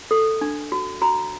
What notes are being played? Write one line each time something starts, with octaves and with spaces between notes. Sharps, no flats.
A4
D4
F#4
F#4 A#5